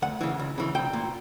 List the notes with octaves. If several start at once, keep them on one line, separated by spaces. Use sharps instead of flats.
D2 F#5
C#3 E3
C#2
C#3 E3
C2 G5
A#2